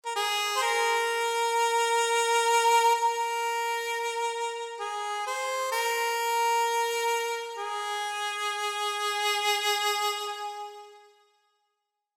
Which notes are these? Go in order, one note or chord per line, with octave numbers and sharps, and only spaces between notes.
A#4
G#4
C5
A#4
A#4
G#4
C5
A#4
G#4